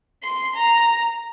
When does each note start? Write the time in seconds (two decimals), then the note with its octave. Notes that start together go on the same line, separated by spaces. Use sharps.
0.23 C6
0.56 A#5